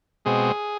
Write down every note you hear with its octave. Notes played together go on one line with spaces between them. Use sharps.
B2 G#3 C4 G#4